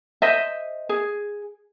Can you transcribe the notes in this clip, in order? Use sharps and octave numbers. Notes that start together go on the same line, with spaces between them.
C5 D#5 E5
G#4